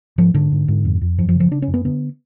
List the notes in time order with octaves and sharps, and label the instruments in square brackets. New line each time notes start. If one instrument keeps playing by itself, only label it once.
[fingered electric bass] G#2 F3
G#2 D3
G#2
G#2
F2
F2
F#2 F3
F3
C#3
F3
C#3 D4
C#4
F#2
B3
D3 B3